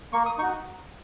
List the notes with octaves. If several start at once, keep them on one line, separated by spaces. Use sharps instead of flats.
A#3 C#6
D#6
D#4 F#4 C#6